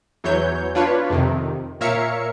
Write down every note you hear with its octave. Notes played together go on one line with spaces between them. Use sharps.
E2 E3 F#3 C#5 G6
D4 F4 B4 C#5
F2 C3 D#3
A#2 A#4 C#5 E5 F5 C#7